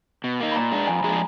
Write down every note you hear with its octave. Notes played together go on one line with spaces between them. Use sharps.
B2
A#3 D#4
B5
A#2 A#5
G#3 D4
F2 G#5
B5
F3 G#3 D4 G#4 A#5